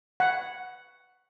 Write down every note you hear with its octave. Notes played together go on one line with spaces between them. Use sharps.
F#5